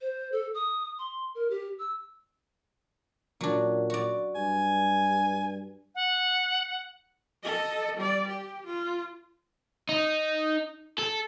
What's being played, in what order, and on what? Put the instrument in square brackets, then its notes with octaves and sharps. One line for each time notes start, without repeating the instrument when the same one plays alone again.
[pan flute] C5
A4
D#6
C6
A#4
G4
E6
[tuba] A#2 [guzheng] F#3 D4
[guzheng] F#4 D5
[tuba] G2 [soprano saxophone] G#5
[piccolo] F#5
[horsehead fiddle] A4 D#5
G3 D5
G4
F4
[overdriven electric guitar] D#4
A4